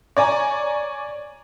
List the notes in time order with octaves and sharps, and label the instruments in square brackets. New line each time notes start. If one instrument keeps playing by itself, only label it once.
[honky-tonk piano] C#5 D5 G#5 A#5